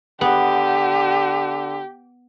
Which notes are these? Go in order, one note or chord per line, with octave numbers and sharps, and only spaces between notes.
D3 B3 G4